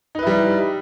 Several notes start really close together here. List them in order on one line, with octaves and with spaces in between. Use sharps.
D#4 B4 E4 G3